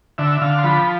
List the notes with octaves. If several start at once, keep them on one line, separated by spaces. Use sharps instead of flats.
D3 E5
D3 F5
C6
F3 B5